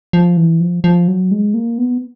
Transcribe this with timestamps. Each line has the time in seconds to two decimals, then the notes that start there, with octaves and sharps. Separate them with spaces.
0.13 F3
0.37 E3
0.61 F3
0.84 F3
1.08 F#3
1.31 G#3
1.54 A#3
1.78 B3